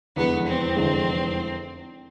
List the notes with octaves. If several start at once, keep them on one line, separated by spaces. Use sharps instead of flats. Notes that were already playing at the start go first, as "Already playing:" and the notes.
F1 E2 D3 G#3 B3
C4
F1 E2 D3 G#3